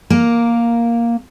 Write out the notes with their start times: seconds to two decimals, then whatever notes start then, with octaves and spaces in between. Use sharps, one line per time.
0.10 A#3 A#4